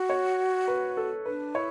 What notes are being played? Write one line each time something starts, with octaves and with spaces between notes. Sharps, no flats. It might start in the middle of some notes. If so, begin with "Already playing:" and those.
Already playing: F#4
C#5
B4
A4
D4 B4
E4 C#5